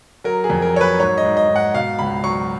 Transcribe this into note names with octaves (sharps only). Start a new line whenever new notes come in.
F#3 A#4
G#4
F2
A#4
F#3 C#5
B4
G#2 C#5
D#5
G#2
D#5
G#2
F#5
B2 F5
C#2 B5
F#3 C#6